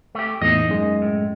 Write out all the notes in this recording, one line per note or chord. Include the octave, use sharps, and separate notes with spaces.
A3 G4
E2 A2 A#3 D#4 D#5
F#2 G#3
A2